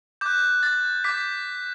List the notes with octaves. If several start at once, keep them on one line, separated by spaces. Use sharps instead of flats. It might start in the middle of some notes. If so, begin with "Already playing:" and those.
D6 F#6 G6
A6
D6 G6 B6